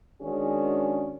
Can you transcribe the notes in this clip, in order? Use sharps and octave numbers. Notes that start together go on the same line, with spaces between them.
D#3 G#3 C#4 D4 F#4 G#4